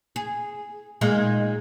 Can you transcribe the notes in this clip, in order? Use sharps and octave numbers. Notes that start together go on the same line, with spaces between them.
G#4
A#2 G#3 D#4